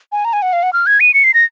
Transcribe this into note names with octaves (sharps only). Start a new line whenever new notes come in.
G#5
A#5
G#5
F#5
F5
F#5
F6
G#6
D#7
C#7
C7
A#6